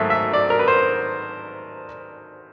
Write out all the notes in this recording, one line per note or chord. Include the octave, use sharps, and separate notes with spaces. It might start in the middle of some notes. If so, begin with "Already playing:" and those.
Already playing: G#2 D#3 F#3 A3 E5
E5
D5
A#4
B4
C5